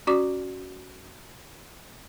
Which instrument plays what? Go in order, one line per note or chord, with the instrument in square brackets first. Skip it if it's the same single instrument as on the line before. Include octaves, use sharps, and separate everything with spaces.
[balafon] C#4 F#4 D5 C#6 D6